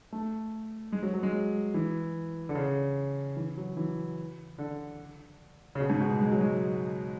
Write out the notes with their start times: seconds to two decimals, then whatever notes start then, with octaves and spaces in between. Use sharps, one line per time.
0.12 A3
0.92 G#3
1.03 F#3
1.14 F#3
1.23 G#3
1.74 E3
2.49 D3
2.55 C#3
3.37 E3
3.57 F#3
3.77 E3
4.58 D3
5.75 C#3
5.80 B2
5.90 G#2
6.00 B2
6.21 G#3
6.32 F#3
6.41 G#3